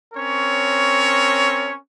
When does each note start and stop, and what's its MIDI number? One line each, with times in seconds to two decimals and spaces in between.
0.14 1.75 60
0.14 1.75 61
0.14 1.75 70
0.14 1.75 73